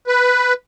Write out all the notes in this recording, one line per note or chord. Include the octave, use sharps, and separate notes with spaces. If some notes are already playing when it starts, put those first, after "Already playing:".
B4